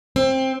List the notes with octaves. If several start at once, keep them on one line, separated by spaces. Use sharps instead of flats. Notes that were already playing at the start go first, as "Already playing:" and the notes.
C4